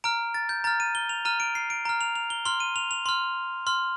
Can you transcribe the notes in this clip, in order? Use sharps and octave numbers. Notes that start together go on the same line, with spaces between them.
A#5 F6 D7
A6
G6
A#5 F6 A6
D#7
G7
F7
A#5 F6 D#7
D7
C7
D7
A#5 F6
F7
F7
G7
C6 F6 G7
D#7
F7
F7
C6 F6
C6 F6